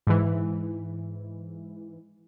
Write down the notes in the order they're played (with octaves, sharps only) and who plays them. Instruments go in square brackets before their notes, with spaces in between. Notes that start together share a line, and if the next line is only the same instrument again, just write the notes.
[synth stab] G#2 E3